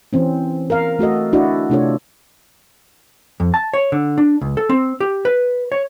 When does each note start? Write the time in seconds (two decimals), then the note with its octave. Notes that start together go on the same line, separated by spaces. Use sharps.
0.13 E3 C4 C#4
0.70 A#4 F5
0.99 A3 F#4 A4 D#5
1.33 D4 E4 F#4 D5 D#5
1.70 C3 A3 D4 F4 A4 C#5
3.40 F2
3.54 A5
3.74 C#5
3.92 D3
4.18 D4
4.41 C#2
4.57 A4
4.69 C4
5.00 G4
5.25 B4
5.72 C#5